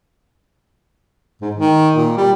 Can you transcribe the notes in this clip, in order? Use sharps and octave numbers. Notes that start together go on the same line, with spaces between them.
G#2
D#3
A#2
G3